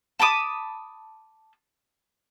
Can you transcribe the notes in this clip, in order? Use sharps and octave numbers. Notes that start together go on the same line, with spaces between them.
A5 B5 D6 D#6